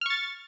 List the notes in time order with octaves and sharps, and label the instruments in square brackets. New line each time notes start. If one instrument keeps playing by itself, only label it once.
[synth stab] F6
C#6
A6